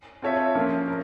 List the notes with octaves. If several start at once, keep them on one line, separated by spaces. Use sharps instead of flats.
C4 F4 A4 C#5 E5
F3 A#3 C#4 F4
A#4